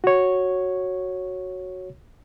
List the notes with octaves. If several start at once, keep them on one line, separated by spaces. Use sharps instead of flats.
F#4 C#5